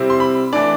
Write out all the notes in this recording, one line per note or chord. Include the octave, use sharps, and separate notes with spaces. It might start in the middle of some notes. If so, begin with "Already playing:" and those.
Already playing: C3 G3 C4 E4
C6
B5
E3 A3 D4 D5